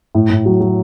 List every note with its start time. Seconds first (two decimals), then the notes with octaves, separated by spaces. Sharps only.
0.15 A2
0.30 A2
0.46 F#3
0.61 F#3